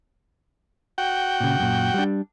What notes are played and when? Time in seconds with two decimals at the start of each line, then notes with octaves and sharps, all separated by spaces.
0.98 F#4 G5
1.40 A#2 C#3
1.60 F#2 A#2
1.94 G3 D4